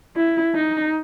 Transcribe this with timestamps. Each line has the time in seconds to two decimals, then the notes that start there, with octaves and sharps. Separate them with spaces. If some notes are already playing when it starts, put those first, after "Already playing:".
0.16 E4
0.55 D#4